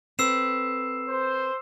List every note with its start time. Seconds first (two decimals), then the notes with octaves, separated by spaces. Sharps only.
0.19 C4 A4 B4 E6 C7 E7
1.08 C5